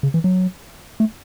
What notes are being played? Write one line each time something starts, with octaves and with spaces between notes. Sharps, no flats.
C#3
E3
F#3
A3